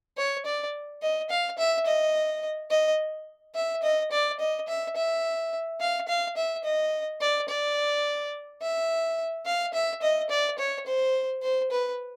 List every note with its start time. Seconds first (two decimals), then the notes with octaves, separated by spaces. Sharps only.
0.17 C#5
0.46 D5
1.02 D#5
1.30 F5
1.58 E5
1.86 D#5
2.71 D#5
3.55 E5
3.83 D#5
4.12 D5
4.40 D#5
4.68 E5
4.96 E5
5.81 F5
6.08 F5
6.37 E5
6.64 D#5
7.21 D5
7.49 D5
8.62 E5
9.46 F5
9.74 E5
10.02 D#5
10.30 D5
10.59 C#5
10.87 C5
11.42 C5
11.71 B4